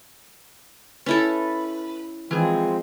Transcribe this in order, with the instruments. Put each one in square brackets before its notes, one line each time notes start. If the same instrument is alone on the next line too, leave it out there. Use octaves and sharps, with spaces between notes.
[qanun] C#4 E4 A4 [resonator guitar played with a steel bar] B4
[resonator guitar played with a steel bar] E3 G#4 [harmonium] F3 G#3 C4